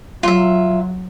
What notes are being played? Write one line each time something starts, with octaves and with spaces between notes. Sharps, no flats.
F#3 F4 E5